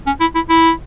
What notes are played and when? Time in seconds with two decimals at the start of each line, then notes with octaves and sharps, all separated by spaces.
0.07 C#4
0.20 E4
0.35 E4
0.49 E4